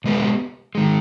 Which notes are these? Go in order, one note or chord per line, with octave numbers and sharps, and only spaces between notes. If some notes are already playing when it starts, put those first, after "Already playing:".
B2 G#3 B3 G4 B4
D#3 G#3